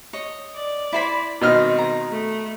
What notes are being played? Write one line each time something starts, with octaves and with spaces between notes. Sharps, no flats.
C#5 D#5
D5
E4 C5 B5
B2 D#3 C4 D#4 F6
A#5
A3